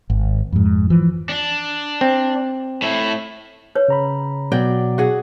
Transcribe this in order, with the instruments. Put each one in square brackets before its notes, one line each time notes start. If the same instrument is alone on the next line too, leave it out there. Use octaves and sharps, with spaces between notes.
[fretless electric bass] G#1
F2 G#2
E3 F3
[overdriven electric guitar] D4
[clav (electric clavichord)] C4
[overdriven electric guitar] A2 E4
[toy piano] B4 C#5
[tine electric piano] C#3 A#5 B5
[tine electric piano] B2 B3 [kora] F#3 D5 G5
[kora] F#4 G#4 F#5